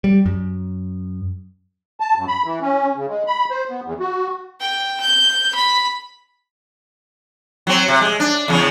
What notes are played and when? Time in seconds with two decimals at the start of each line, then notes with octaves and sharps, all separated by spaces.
0.04 G3
0.26 F#2
2.00 A5
2.16 F#2
2.28 B5
2.45 E3
2.61 C#4
2.96 C#3
3.08 G#3
3.27 B5
3.51 C5
3.70 B3
3.84 E2
4.00 F#4
4.60 G5
5.00 G6
5.55 B5
7.67 F#3 C4
7.88 C3
8.01 G#3
8.20 D4
8.48 E2 C#3